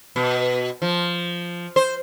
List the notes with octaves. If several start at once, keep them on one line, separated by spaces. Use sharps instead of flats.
B2
F3
C5